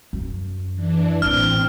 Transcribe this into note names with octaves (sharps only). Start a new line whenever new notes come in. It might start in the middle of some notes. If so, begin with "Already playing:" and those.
F#2
E3 D4
A1 A#2 C4 F6